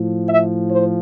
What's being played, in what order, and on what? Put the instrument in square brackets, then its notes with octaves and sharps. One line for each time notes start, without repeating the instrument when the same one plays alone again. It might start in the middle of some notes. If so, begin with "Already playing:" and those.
Already playing: [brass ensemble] A2 F3
E5
C5